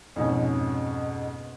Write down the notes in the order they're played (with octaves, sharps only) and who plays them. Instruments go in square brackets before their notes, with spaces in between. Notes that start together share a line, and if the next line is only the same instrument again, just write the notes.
[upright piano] F2 G#2 B2 C#4